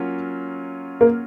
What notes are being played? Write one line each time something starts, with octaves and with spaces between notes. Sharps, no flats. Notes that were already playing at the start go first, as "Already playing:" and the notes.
Already playing: F#3 A#3 C#4 F4
A#3